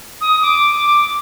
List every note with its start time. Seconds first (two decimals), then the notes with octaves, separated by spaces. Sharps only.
0.21 D#6
0.42 D6